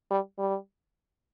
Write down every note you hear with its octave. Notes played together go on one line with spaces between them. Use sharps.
G3
G3